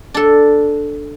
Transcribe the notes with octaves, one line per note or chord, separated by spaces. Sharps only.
D4 A4